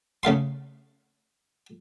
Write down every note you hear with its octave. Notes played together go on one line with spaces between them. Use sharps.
C#3 A3 F5 C6